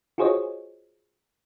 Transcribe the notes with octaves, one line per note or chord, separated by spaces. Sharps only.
F4 F#4 G#4 C5 C#5 D#5